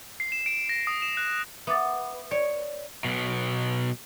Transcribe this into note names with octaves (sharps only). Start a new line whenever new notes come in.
C7
E7
D7
A#6
D#6
E7
F#6
B3 E5 D6 A6
C#5 D5
B1 B2